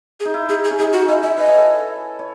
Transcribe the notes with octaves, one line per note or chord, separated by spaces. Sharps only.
G#4
D#4
E4
D#4 G#4
G#4
C#4
D#4 G#4
F#4
E4 D#5
G#4 E5
B4 D#5
C#5
A4
C#5